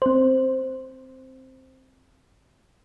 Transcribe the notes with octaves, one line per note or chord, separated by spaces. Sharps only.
C4 C5